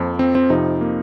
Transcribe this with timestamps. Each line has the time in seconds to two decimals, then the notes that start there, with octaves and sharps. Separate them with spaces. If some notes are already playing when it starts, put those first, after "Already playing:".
Already playing: F2 F3 A#3
0.19 C4
0.35 C4
0.50 F2 C3 F3 D#4
0.81 A#3